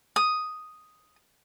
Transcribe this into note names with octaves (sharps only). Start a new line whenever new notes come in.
D#6